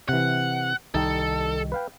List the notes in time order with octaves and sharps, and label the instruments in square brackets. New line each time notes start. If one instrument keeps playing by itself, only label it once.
[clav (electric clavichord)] C3 E3 [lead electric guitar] F#5
[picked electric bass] C2 D#3 G3 [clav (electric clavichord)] D#4 [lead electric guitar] A4
[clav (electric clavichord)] B4 F5 G5